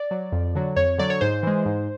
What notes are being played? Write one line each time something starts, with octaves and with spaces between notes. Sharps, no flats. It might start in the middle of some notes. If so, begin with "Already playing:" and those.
Already playing: D5
F#3
F2
D3 F#3
F2 C#5
D3 F#3 D5
C#5
G#2 C5
E3 G#3
G#2